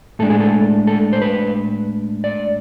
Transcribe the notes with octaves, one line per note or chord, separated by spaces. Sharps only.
A2 G#3 D4 A4
G#4
A4
A4
C5
B4
D5